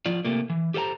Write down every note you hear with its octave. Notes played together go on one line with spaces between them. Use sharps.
F3 F4 D5
C3 A3 A#3
E3
G4 A4 C5 F#5 A#5